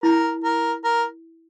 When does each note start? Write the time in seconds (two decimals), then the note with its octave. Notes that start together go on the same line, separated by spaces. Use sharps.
0.03 E4 A#4
0.44 A#4
0.84 A#4